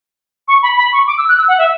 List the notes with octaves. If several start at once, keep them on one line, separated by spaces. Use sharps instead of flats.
C#6
B5
B5
C#6
D6
E6
F#6
E6
F#5
E5